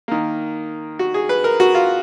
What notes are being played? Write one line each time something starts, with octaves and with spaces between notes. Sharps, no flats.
D#3 A#3
F#4
G#4
B4
A#4
F#4
F4